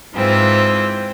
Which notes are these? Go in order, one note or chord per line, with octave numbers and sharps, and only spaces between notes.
G#2 E3 C4 F4